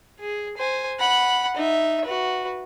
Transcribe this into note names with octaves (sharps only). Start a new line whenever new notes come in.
G#4
C5 G#5
F#5 B5
D#4 E5
F#4 B4